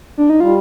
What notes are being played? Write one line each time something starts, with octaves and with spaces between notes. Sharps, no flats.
D4
D#4
G3 F4